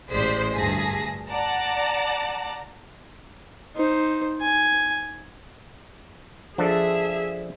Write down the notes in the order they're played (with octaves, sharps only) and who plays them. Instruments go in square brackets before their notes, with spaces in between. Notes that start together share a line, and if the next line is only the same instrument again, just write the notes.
[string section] A1 G#3 C5 D5 B6 C7
D2 G2 G#4 A5 A#6 B6
D5 F#5 A5 A#5
[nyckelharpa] D#4 C5
G#5
[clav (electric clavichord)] F3 D4 A4 [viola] G#4 E5